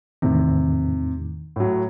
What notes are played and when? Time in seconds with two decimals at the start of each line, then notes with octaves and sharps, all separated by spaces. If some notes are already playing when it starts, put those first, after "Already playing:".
0.22 E2 A2 C3 D#3
1.56 A2 F#3